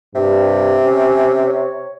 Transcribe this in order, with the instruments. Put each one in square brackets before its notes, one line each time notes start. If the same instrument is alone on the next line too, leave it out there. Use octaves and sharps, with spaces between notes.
[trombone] G2 [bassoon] C3
[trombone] C#4
C#5